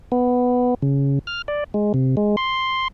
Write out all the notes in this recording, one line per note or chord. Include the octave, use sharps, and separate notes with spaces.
B3
C#3
F6
D5
G#3
C3
G#3
C6